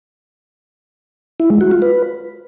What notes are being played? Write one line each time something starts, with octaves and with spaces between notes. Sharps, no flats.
E4
G#3
F#4
F4
B4